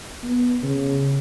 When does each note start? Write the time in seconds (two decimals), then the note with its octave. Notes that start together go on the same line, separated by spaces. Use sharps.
0.24 B3
0.63 C#3